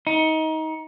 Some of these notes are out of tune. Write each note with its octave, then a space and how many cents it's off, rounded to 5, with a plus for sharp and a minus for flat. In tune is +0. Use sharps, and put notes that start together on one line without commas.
D#4 +25